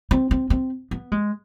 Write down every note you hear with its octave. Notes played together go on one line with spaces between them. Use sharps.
C4
C4
C4
B3
G#3